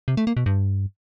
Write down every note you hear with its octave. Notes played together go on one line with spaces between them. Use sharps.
C3
A3
A#3
B2
G2